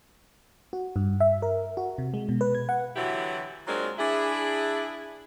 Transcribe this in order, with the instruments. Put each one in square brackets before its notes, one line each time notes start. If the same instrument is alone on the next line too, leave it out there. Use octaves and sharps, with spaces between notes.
[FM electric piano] F#4
G2
E5
A#4
F#4
C3
G#3
B2
B4
G#6
F#5
[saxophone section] D3 E3 F#3 E4 F#4 G4
F#3 G#3 A#3 C4 D4 F4
D4 E4 G#4